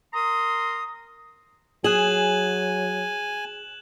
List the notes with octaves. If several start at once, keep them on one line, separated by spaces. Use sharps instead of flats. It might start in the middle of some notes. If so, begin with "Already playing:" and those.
A#4 A#5 C6 D#6
F#3 G#4 G#5 F#6 E7 F#7